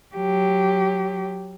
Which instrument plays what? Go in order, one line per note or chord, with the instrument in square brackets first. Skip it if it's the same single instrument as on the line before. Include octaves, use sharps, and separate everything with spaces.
[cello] F#3 G4